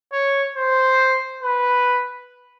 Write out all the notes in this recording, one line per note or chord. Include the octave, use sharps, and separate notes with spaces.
C#5
C5
B4